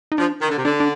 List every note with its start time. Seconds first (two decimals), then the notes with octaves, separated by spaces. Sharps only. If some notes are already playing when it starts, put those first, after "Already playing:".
0.12 D#4
0.18 F3 D4
0.42 D#3
0.49 D3
0.57 C3
0.65 D3 D4
0.80 D4